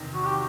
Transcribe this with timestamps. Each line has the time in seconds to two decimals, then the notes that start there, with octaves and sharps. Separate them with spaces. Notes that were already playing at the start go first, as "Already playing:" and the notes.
Already playing: E2 C3 D#3
0.14 F#4
0.25 G4